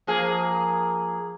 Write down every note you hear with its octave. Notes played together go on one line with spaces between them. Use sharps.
F3 A#3 G#4